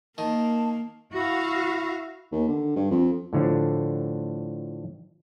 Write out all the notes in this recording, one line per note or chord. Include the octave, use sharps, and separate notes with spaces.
D#3 A#3 A5
E4 F#4 F5
D#2
D3
G2
F2
A2 D3 F3 D4